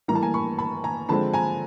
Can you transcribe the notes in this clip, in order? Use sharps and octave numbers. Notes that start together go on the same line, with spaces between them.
A2 E3 G3 A#3 A#5
A5
G#5 A#5
B5 C#6
A5 B5
G#5 A#5
D3 F3 G#3 C4 A5 B5
G#5 A#5